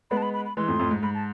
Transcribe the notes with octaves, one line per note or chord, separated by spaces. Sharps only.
G#3 B3 B5
A5
B5
B5
B5
E3 G#3 C6
F2 A2
F2 A2
G#2
G#2 B5
A5